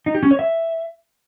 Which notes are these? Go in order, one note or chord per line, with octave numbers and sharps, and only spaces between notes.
D#4
G4
C#4
C#5
E5